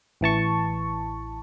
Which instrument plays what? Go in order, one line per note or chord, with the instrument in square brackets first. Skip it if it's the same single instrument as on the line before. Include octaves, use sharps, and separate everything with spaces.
[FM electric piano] A1 E3 A5 C#6